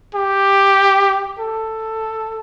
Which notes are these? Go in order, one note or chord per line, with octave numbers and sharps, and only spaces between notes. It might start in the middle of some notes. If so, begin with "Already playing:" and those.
G4
A4